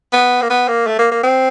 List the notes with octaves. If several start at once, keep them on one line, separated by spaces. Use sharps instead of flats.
B3
A#3
B3
A#3
A3
A#3
A#3
C4